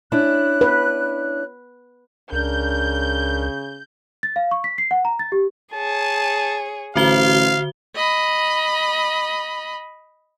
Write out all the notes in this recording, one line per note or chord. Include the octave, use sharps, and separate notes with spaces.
C#4 D4 E4 F#6
B4
C#2 C#3 D4 A#4 G6
A6
F5
C#6
B6
C7
F#5
A#5
A6
G4
G#4 C#5 A5
A1 D3 F#4 C5 F5 G7
D#5 B5